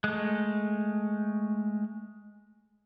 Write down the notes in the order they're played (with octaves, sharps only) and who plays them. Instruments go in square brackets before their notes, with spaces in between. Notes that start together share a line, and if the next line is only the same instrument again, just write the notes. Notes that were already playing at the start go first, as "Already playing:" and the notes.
[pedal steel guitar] G#3 A3